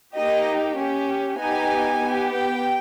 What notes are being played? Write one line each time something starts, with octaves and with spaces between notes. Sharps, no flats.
A#3 D#4 G4 D#5
C#4 G4
B3 D#4 G4 G#5
B3 G4
G5